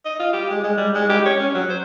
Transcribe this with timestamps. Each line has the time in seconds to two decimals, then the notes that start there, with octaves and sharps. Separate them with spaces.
0.05 D#5
0.19 F4
0.33 G4
0.50 G#3
0.64 G#3
0.77 G3
0.95 G#3
1.09 G4
1.25 C#5
1.40 C#4
1.55 F#3
1.70 C5